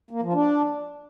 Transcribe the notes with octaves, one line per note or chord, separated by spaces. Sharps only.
A#3
F3
D4